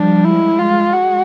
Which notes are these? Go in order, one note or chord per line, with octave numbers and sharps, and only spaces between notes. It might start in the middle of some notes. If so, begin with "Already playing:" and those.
Already playing: F3 G3 D4
G#3 E4
F4
G#3 F#4